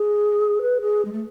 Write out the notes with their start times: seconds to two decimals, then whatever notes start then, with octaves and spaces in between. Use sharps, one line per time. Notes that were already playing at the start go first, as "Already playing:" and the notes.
Already playing: G#4
0.61 B4
0.81 G#4
1.05 G#3
1.12 A3